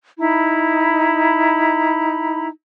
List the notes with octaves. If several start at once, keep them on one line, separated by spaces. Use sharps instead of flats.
D#4 E4 A#5 B5